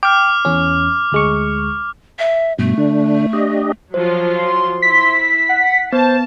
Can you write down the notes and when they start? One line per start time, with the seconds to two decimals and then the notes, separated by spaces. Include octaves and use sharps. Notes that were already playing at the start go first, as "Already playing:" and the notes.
0.03 G5 D6 F6
0.45 E2 C#4
1.12 D2 G#3 C#6
2.19 E5
2.59 G2 B2 A3
2.78 D3 D4
3.33 D4 G4 D#5
3.94 F3 F#3 F4 C5
4.38 C6
4.82 E4 B6
5.49 F#5
5.93 B3 C5 A5